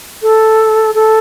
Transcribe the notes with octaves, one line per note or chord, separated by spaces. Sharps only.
A4
A4